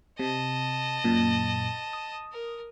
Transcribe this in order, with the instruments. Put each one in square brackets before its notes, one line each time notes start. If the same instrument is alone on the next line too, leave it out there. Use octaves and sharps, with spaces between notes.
[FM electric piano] C3 [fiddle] D#5 A5
[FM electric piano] F#2 A#2
D#6
[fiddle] A#4